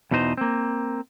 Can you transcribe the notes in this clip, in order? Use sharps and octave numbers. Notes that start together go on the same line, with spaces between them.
E2 B2 E3 D#4 C5
A#3 C4